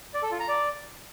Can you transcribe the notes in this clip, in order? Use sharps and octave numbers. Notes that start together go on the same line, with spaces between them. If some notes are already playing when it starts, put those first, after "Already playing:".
D5
A4
F4
A#5
D5